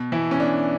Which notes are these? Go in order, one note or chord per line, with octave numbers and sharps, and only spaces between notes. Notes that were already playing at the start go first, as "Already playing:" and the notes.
Already playing: B2
B2 E3 E4
C#4
B2 D4